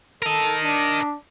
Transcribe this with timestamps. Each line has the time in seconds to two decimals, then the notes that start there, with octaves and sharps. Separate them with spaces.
0.22 A4 A#4 D#5
0.63 D4